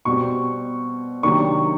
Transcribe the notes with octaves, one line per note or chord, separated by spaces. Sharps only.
B2 G3 C4 C#6
C3 D#3 F#3 A#3 D4 C#6